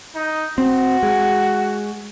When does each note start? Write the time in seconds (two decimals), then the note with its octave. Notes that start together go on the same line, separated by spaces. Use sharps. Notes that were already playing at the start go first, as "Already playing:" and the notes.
0.15 D#4
0.58 C4 F#4
1.03 G#3